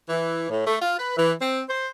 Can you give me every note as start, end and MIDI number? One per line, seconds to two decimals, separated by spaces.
0.09 0.47 52
0.49 0.65 45
0.66 0.76 57
0.81 0.96 65
0.98 1.16 71
1.16 1.32 52
1.40 1.61 60
1.68 1.88 72